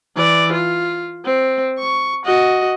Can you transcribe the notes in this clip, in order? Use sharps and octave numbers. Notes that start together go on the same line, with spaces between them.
E3 D5
F4
C4
C#6
F#4 D#5